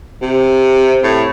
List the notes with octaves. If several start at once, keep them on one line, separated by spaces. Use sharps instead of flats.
C3
A2